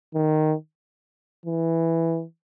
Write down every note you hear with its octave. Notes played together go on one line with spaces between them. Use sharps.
D#3
E3